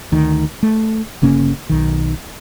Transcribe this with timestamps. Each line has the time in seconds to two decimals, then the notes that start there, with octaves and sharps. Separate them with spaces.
0.12 D2 D#3
0.63 A3
1.22 G1 C#3 A#3 C#4
1.69 B1 D#3